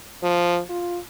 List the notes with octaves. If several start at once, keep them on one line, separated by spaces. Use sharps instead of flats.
F3
F4